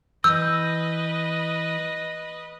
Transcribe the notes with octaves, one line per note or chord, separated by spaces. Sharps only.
E3 B4 D#5 E6 G6